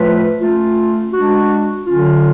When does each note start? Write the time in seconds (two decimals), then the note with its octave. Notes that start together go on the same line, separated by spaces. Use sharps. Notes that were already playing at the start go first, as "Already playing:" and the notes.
Already playing: A2 F3 A3 F4 B4
0.40 A3 C#4 F4
1.13 G#3 D4 F#4
1.87 D3 F#3 C#4 F4